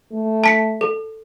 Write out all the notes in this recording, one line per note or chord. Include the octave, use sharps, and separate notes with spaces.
A3
A5 B6 C#7
A4